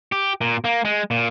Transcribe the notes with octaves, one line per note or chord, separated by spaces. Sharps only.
G4
A#2
A#3
G#3
A#2